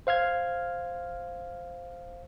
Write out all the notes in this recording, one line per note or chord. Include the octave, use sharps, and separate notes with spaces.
C5 F5 F6 G#6